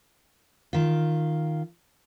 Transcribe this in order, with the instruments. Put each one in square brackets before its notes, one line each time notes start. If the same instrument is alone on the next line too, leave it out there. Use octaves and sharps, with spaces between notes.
[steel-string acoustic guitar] D#3 F4